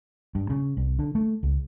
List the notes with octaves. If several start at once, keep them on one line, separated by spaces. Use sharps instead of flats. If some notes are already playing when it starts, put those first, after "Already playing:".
G2
C#3
C2
D3
A3
C#2